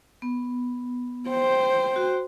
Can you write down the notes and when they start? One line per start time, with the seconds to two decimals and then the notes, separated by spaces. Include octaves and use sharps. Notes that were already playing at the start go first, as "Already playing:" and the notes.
0.22 B3
1.30 C5 G5
1.96 F#4